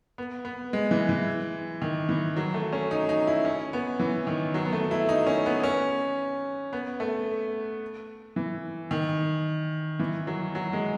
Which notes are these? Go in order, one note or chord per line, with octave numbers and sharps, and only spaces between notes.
B3
B3
G#3
E3
E3
D#3
E3
F#3
A3
C#4
D#4
D#4
E4
C#4
B3
E3
D#3
F#3
B3
A3
E4
D#4
C#4
B3
C#4
B3
A3
E3
D#3
E3
F#3
F#3
G#3